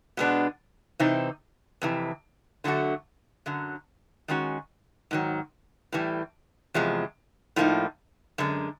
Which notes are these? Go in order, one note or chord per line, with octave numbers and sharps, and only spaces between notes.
B2 G#3 B3 D4
C3 E3 C4 D#4
F2 C3 E3
D3 F#3 A3 D4 F#4
F#2 D3 F#3
D#3 G#3 C#4 F#4
G#2 D#3 F#3
A2 E3 G3
E2 C3 F3 G#3
A2 F3 A#3 D#4
F#2 D3 G#3